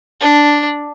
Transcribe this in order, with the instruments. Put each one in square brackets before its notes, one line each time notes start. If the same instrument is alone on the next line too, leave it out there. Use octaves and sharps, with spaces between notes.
[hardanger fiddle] D4